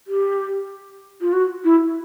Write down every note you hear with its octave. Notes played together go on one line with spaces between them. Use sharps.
G4
F4
F#4
E4